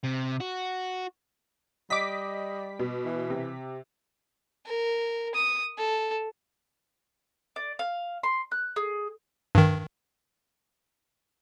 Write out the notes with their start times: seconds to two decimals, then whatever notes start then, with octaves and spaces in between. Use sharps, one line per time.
0.04 C3
0.41 F#4
1.90 G3 D#5 D6 B6
2.79 B2
3.05 E3
3.30 C3
4.66 A#4
5.35 D#6
5.78 A4
7.56 D5
7.79 F5
8.23 C6
8.52 F#6
8.76 G#4
9.55 G2 D#3